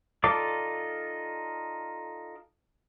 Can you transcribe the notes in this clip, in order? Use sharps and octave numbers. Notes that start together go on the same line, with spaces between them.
D#4 F4 A4 D5 D6